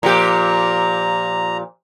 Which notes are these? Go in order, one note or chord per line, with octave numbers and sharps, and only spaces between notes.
A#2 F3 G4 A#5